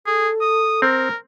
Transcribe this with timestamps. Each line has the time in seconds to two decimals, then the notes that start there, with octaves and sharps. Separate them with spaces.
0.06 G#4 A4
0.41 D#6
0.82 C4 A#4